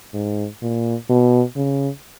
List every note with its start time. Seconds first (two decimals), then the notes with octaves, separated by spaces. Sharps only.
0.14 G#2
0.62 A#2
1.09 B2
1.56 C#3